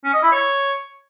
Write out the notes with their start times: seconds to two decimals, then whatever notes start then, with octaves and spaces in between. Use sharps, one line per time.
0.04 C#4
0.13 D#5
0.23 E4
0.32 C#5